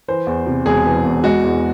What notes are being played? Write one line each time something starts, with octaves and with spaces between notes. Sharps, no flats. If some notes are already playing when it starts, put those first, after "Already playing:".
E3 C5
E2
C3
E1 G#4
E3
E2
G#3 F#4
E2